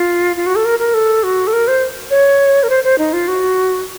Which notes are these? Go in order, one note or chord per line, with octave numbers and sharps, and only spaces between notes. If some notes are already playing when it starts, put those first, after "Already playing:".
Already playing: F4
F4
F#4
A4
A#4
A#4
A4
F#4
A4
A#4
C5
C#5
A#4
C5
C5
D#4
F4
F#4